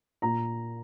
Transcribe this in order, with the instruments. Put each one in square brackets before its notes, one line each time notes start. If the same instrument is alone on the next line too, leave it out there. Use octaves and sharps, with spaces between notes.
[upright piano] A#2 A#5